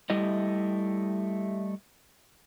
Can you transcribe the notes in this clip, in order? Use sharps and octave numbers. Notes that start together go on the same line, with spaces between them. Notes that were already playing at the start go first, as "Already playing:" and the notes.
G3 A3 E4 G4 D#5